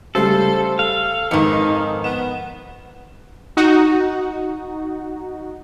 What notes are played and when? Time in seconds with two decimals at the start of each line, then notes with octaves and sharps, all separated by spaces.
0.15 C#3 G3 A3 A4 C5
0.79 A4 F5
1.31 F2 G#2 D#3 D#4 B4 C#7
2.04 B3 E7
3.57 D#4 F#4